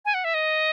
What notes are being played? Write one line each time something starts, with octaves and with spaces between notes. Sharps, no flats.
G#5
F#5
E5
D#5